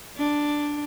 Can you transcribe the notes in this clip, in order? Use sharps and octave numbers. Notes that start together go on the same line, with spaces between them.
D4